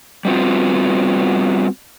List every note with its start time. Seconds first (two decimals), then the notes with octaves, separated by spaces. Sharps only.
0.25 G3 B3 C4 F4 F#4